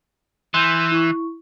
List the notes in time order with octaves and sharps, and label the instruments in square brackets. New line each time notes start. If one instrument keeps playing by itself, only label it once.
[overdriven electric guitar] E3 [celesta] C6 G6
[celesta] E4 C#6